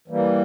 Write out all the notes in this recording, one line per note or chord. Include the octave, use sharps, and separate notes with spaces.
E3 G3 A#3